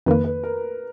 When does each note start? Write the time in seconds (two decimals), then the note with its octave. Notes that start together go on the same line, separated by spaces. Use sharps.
0.06 F2 D#3 A#3 B4
0.24 B4
0.43 A#4